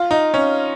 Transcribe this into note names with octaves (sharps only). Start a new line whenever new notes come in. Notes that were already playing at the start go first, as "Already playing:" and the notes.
Already playing: F4
D#4
C#4